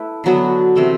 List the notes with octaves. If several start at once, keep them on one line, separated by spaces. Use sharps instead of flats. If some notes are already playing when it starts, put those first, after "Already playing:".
Already playing: A3 E4 B4
D3 F#3 B3 F#4
C3 E3 A3 C4